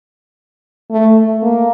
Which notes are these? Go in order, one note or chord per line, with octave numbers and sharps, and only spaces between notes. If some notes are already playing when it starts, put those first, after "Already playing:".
A3
A#3